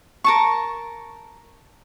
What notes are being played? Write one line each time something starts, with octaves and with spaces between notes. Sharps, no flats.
A#4 A5 C#6